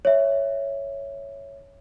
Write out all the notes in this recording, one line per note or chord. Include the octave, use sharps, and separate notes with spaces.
C#5 E5